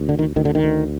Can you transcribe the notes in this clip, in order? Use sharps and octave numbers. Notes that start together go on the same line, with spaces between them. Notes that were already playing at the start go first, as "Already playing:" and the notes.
Already playing: D2
D3
D#3
D2 D#3
D3
D#3
D2